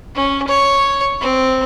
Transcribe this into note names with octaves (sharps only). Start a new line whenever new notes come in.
C#4
C#5
C4